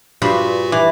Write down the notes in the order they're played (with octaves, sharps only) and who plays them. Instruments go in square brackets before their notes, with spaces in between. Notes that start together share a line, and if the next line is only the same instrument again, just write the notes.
[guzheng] G2 C5 B5 [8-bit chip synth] A#2 F#4
[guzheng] E3 [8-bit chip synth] D6